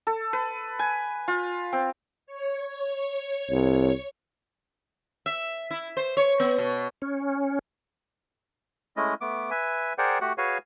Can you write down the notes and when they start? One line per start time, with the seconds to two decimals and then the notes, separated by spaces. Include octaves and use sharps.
0.07 A4
0.33 B4
0.79 G#5
1.28 F4
1.73 C4
2.27 C#5
3.51 C2
5.26 E5
5.71 E4
5.97 C5
6.17 C#5
6.40 B3
6.58 B2
7.02 C#4
8.97 G#3 A3 C#4 E4 D#5
9.21 A3 B3 D6
9.51 B4 E5 G#5
9.98 G#4 A#4 C5 D5 F#5 G5
10.21 A3 F#4 G4 F#5
10.38 F#4 G#4 B4 C#5 F5 G#5